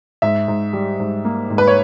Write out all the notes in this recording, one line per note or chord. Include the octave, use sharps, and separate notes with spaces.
G#2 E5
G#2
G3
G#2
A#3
G#2
B4
C#5